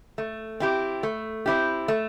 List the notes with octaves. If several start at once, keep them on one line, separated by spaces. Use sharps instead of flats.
A3
C4 E4 G4
A3
C4 E4 G4
A3